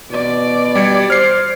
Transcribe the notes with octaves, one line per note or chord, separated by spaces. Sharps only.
B2 D5
G3 G#6 C#7
C5 F6 C7